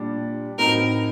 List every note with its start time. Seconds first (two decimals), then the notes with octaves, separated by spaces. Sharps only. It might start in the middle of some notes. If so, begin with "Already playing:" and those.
Already playing: A#2 G3 D4 G4
0.58 A2 F#3 C4 D#4 A#4